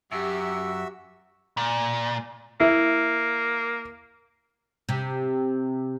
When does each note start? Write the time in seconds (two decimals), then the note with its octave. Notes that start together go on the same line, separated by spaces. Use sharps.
0.12 F#2 F#4 G4 E5 E6
1.57 A#2
2.60 A#3 E4
4.89 C3